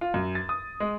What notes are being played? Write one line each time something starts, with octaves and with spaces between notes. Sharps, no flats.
F4
F#2
A6
D#6
G#3